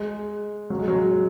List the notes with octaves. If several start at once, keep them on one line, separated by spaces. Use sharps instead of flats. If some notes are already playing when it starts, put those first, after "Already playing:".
Already playing: G#3
F#3
G#3
F#3